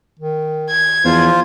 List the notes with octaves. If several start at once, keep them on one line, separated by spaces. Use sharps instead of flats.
D#3
G#6
E2 F3 F4 C5